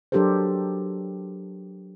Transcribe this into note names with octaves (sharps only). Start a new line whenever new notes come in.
F#3 D4 G4 A4 A#4 C5